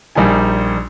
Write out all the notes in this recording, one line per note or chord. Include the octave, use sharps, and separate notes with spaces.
A#1 G3 A#3 D#4 G#5